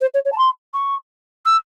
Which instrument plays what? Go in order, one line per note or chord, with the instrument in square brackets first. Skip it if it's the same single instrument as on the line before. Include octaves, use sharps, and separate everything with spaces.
[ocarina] C5
C#5
C#5
A5
C6
C#6
E6